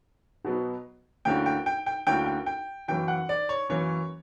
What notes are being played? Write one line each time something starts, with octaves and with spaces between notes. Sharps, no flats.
B2 F#3 B3
D2 D3 A#3 C#4 E4 G5
G5
G5
G5
D2 D3 A#3 C#4 E4 G5
G5
G5
F#2 E3 A#3 C#4 G5
F#5
D5
C#5
F#2 E3 A#3 C#4 C#5